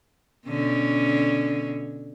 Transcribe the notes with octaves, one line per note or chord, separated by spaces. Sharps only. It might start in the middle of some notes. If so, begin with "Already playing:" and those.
B2 D3 C#4